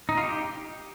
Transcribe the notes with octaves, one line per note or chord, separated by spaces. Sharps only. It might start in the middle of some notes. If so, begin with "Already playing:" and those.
D#4
F4
G4